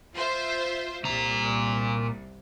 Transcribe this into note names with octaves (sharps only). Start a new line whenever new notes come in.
F4 C5 E5
C2 A#2 A#5